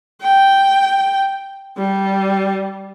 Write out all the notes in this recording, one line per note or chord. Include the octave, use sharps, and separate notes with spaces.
G5
G3